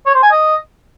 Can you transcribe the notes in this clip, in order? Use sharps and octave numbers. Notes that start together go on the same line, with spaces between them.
C#5
C5
G#5
D#5